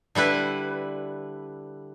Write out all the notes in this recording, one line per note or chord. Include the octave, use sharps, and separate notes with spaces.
D3 G3 E4 B4